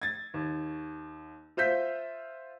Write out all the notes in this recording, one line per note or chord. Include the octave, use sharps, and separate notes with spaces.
G#6 A6
D#2
F4 C5 E5 G6 B6